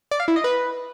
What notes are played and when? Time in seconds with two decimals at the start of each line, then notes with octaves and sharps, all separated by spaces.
0.11 D5
0.20 F5
0.28 E4
0.36 D#5
0.44 B4